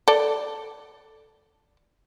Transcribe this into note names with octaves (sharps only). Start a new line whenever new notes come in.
A4 D5